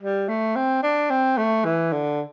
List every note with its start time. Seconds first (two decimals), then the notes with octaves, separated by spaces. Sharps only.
0.01 G3
0.29 A3
0.56 C4
0.83 D4
1.10 C4
1.38 A3
1.65 E3
1.93 D3